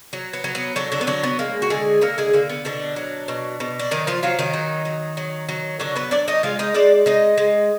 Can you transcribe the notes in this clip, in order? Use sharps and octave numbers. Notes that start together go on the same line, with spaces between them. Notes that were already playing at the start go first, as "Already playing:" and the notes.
F#3
B3
F#3
B3
D3 F#3 D4
D3 D4
B3
D3 F#3 D4
B3
G#3 A#3
F#4
D3 G#3 G#4
D3 A#3 A#4
G#3 G#4
D3 A#3
B3
B2 D3 D4
F#3
B2
B2
D4
D#3 F#3 D#4
F3 F4
F3 F#3 F4
D#3 D#4
F#3
F#3
F#3
F#3
D3 F#3 D4
B3 B4
F#3 D4 D5
D#4 D#5
G#3 F4 F5
D#4 D#5
G#3 D4 D5
G#3 D#4 D#5
G#3